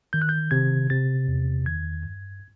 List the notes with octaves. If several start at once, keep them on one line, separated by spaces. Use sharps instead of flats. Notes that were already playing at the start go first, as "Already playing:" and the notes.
D#3 G6
F#6
G6
C3 G#6
C3 A6
E2
D#3 G#6
G2